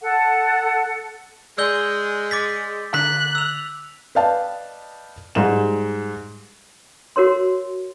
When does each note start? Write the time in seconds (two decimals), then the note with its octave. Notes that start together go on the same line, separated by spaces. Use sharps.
0.01 A4 F#5
1.58 G#3 D5 G#5 C6 E6 G6 G7
2.31 D6 A6 B6
2.94 D3 A#5 F#6 B6
3.35 E6 F7
4.15 B4 D5 D#5 F5 G5 A5
5.35 G#2 G3 E7
7.16 F#4 A#4 C#5 C6